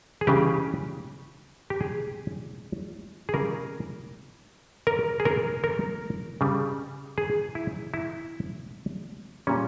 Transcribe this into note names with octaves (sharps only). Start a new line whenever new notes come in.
G#4
C#3 E3 G3 G4
G4
G#4
G#4
C#3 G3 A#4
A#4
G#4
A#4
A#4
C#3 G3
G#4
E4
E4
A#2 G3 C#4